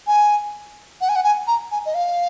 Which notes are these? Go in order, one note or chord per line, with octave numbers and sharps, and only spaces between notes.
G#5
F#5
G#5
F#5
G#5
A#5
G#5
D#5
F5